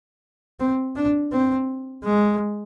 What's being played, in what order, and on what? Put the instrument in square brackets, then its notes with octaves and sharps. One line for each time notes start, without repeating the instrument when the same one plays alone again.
[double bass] C4
D4
C4
G#3